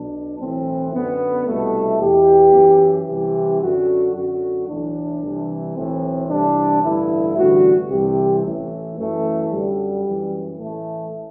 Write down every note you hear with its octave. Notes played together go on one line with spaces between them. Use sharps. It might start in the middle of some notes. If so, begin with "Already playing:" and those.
Already playing: B1 B2 D4
B1 A2 E3 C4
F#2 D3 B3
C2 B2 A3
E2 B2 G4
F#2 E3
C2 C3 E3 G4
F#2 D3 F#4
F#2 D3 F#4
B1 A2 E3 D4
C2 C3 E3
B1 A2 E3 C4
C2 C3 E3 D4
A1 G2 D3 E4
A1 G2 D3 F#4
C2 C3 E3 G4
A1 A2 E3
F#2 E3 A3
F#2 D3 G3
F#2 E3
A1 A2 E3 A3